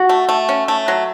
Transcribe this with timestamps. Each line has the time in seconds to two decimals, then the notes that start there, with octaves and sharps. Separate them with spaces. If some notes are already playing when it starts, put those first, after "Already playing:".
Already playing: F#4
0.09 A3
0.29 A3
0.49 C#4
0.68 A3
0.88 F#3